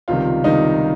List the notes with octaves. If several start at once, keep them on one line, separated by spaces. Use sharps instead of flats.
C#2 C3 D#3 G3 F4
C#2 C3 D#3 G3 D#4